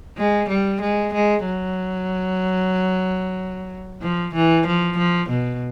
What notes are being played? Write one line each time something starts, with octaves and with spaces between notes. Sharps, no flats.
G#3
G3
G#3
G#3
F#3
F3
E3
F3
F3
B2